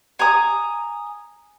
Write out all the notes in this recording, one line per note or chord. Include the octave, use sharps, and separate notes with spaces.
G#5 A#5 D#6